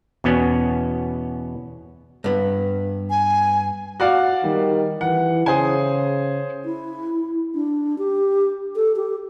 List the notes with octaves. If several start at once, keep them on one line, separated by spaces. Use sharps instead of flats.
E2 B2 B3 C#4
G2 B3
G#5
F#4 D5 F5
D#3 G3
E3 F#5
C#3 G#4 C5 G#5
E4
D4
G4
A4
G4